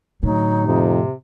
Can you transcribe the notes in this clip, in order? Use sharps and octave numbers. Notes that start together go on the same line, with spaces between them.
A2 D3 F#3 D#4
F2 C3